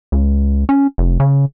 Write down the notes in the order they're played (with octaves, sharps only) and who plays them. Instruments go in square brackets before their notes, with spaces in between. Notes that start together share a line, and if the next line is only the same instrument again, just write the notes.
[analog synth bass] C#2
C#4
F1
C#3